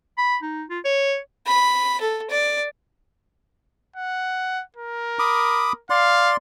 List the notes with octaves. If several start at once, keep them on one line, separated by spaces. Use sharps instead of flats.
B5
D#4
F4
C#5
B5
A4
D5
F#5
A#4
B5 D6 D#6
D5 F5 C6